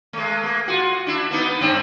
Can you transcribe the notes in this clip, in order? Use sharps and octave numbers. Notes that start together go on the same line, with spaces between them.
G#3 A3
A#3
F4 F#4
D4 E4
A#3 B3 D#4
G2 C4 D4